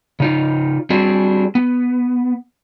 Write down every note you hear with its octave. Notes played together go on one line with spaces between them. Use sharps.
C#3 D#4 F4
G3 C4 D4 F#4 G#4
B3